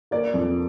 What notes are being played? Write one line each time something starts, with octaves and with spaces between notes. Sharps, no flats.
A#3 D5
F2